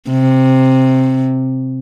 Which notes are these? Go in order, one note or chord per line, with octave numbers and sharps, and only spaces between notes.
C3